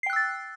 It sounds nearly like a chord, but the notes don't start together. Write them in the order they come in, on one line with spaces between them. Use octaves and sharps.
C7 G5 F#6 E6 A6